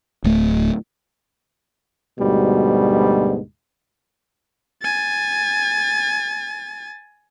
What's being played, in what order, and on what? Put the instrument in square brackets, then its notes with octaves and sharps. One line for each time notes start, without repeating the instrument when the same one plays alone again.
[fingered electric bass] D1 A3
[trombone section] D2 G#2 B2 G3
[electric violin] G#5 A6